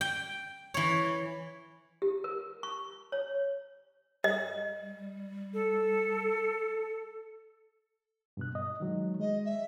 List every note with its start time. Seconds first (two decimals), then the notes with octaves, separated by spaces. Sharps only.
0.01 G5
0.74 E3 C#5
2.02 G4
2.24 A#4
2.63 C#6
3.12 C#5
4.24 G3 D#5
5.54 A4
8.37 G2 B2 F#6
8.55 D#5
8.80 D#3 F#3 G#3
9.20 G#3 D#5
9.45 E5